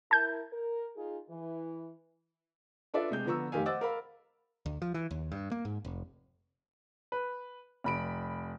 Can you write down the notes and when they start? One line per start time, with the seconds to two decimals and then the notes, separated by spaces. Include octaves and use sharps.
0.11 E4 A#4 A5 G6
0.53 A#4
0.96 D#4 F4 G#4
1.30 E3
2.94 D4 F4 A4 B4 D5 E5
3.10 C3 G#3 G6
3.25 D3 F3 B3 A#5 C#6 E6
3.52 F1 D#3 G4 F5 G#5
3.65 C5 D#5 F#5 D6 E6 A6
3.81 A#4 F5 B5
4.66 D2
4.82 F3
4.94 E3
5.11 D#2
5.32 G2
5.51 A#3
5.65 G#2
5.85 F1
7.12 B4
7.84 F1 B5 D7